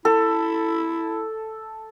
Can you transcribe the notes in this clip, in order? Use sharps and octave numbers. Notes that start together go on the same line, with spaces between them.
E4 A4